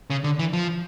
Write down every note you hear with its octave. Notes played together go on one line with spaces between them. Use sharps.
C#3
D3
E3
F3